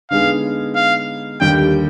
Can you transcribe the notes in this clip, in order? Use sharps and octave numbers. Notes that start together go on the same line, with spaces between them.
D3 G#3 B3 D#4 G#4 F5
F5
D#2 D3 G3 G5